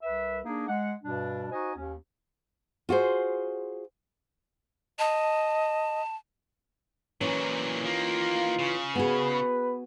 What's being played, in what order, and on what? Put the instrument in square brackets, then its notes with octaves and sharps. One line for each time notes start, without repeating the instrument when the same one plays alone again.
[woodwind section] C2 B4 E5
A#3 D4 D#4 G#4
G#3 F#5
G2 B2 G3 D4
D#4 F#4 C5 D#5 G#5
D#2 C#4
[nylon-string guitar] F4 F#4 G#4 C5
[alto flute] D#5 [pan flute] A5
[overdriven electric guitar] A#2 F#3 [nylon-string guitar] E3 C#4
[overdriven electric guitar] D#3 A#3 [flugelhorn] F4
[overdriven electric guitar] C#3
[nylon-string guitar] B3 F#4 G#4 [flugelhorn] B4